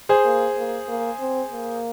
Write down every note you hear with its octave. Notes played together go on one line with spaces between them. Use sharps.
G#4 C5
A#3
A#3
A#3
C4
A#3